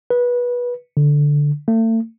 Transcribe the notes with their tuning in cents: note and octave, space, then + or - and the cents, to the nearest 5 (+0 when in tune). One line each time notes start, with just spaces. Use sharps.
B4 -20
D3 -5
A3 +40